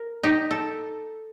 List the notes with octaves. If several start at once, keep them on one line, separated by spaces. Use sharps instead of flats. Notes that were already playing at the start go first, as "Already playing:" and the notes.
Already playing: A#4
D#4 G4
A4